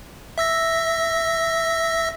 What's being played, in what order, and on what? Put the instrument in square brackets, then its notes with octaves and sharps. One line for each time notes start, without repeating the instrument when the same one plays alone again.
[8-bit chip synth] E5 E6 A#6